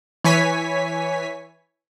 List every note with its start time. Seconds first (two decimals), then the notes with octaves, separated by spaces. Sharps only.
0.24 E3 C#5 G#5 B6